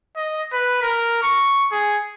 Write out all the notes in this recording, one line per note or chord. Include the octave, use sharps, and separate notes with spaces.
D#5
B4
A#4
C#6
G#4